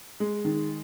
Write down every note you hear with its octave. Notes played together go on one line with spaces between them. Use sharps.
G#3
D#3